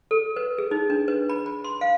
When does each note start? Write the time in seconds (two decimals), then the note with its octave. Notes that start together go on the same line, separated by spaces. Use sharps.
0.11 A4
0.36 B4
0.58 G#4
0.71 D#4
0.90 D4
1.08 B4
1.29 B5
1.46 B5
1.64 C6
1.81 F5